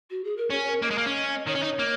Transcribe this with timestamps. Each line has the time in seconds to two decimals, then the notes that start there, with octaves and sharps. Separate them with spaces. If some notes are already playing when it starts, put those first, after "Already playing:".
0.10 F#4
0.24 G#4
0.37 A#4
0.50 C#4 C#5
0.66 A#4
0.82 A#3 D#5
0.91 G#3
0.98 A#3
1.06 C#4
1.47 D#3 C#5
1.55 C#4
1.63 D#4
1.79 A#3